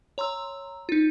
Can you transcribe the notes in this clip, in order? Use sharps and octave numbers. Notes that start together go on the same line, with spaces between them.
C#5 A#5 C6 E6
D#4 F4